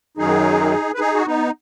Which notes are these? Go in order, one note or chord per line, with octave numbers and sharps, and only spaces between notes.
F#2 D#3 F#3 D#4 G#4
B4
D#4 G#4
F#4
B3 D#4